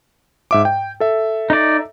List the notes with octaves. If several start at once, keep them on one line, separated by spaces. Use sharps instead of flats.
G#2 E5 D6
G5
A4 E5
D#4 D5